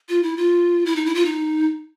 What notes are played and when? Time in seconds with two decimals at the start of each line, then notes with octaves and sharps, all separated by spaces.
0.09 F4
0.23 E4
0.37 F4
0.86 E4
0.96 D#4
1.05 E4
1.15 F4
1.25 D#4